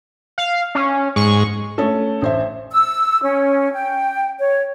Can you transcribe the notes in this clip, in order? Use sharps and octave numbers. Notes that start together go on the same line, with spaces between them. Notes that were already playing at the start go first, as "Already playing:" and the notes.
F5
C#4
G#2 C#6
A3 C#4 A4
A1 C5 E5
E6
C#4
G5
C#5